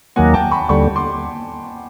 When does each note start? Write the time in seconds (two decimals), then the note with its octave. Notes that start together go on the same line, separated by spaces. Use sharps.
0.16 D#2 D#3 F#3 A#3 F#5 G#5
0.34 G5 A5
0.51 B5 C#6
0.69 D#2 D3 G3 B5 C#6
0.96 C6 D6